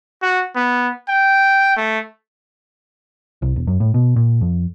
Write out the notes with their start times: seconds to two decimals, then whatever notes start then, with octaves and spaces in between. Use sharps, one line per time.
0.23 F#4
0.56 B3
1.09 G5
1.77 A3
3.42 C2
3.56 E1
3.67 F#2
3.80 A2
3.94 B2
4.16 A#2
4.41 F2